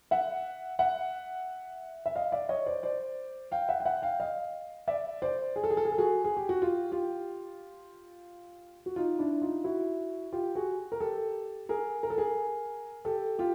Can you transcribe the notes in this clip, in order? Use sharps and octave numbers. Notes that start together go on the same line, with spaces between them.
E5 F#5
E5 F#5
E5
D#5 F5
D5 E5
C#5 D#5
C5 D5
C5 D5
F5 G5
E5 F#5
G5
E5 F#5
F5 G5
D#5 F5
D5 E5
C5 D5
G#4
A4
G#4
A4
G#4
A4
F#4 G#4
G#4
G4
F#4
F4 G4
F4 G4
F#4
D#4 F4
D4 E4
D#4 F4
E4 F#4
F4 G4
F#4 G#4
A#4
G4 A4
G#4 A#4
A#4
A4
G#4 A#4
G4 A4
F4 G4